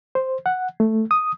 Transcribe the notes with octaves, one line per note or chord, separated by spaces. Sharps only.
C5
F#5
A3
D#6